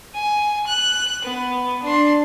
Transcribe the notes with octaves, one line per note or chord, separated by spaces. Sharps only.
G#5
F#6
B3
D4 C6